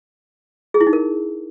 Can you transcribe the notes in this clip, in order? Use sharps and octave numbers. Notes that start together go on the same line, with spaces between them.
G#4
E4
D#4
A#4